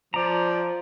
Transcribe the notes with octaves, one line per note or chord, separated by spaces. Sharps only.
F3 D5 A#5